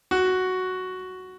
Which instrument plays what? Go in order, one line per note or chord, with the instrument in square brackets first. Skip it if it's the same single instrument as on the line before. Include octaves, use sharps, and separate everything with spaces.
[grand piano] F#4